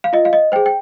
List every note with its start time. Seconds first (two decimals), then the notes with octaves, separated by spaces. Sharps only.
0.04 F5
0.13 F4 D#5
0.25 F5
0.33 D#5
0.52 G#4 C5 G5
0.66 G5